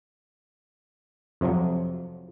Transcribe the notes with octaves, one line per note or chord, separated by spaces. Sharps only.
F2 C3 F3 F#3